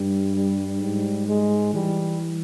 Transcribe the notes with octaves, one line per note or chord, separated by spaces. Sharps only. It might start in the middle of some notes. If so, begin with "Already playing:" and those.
Already playing: G2 G3
G3
G#2 G3
G#3
E3 G3